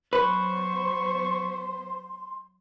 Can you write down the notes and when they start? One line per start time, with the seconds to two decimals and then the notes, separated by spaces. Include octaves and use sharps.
0.13 F#3 B3 B4 C5 C6 C#6